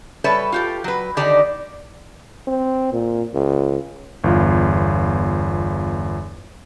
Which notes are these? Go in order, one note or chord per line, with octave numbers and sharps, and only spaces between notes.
G3 A4 B4 C#5 E5
F4 G4 A4
F#3 B4
D3 D#3 D4 D#4 G4 D5
C4
A#2
C#2
G1 E2 F4